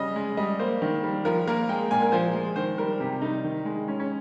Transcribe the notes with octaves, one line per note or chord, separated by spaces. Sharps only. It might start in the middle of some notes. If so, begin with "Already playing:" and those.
Already playing: C#3 G3 D#5
G#3
G3 D#5
A#3 C5
D#3
G3
F3 A#4
A#3 A#4
G#3 G5
A#2 G#5
A#4
F3 C5
G#3
D#3 C5
G3 A#4
C3 G4
G3 D#4
D#3
G#3
G#3 C#4
C#4